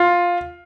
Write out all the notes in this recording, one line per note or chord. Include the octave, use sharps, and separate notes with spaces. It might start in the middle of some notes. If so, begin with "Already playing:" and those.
Already playing: F4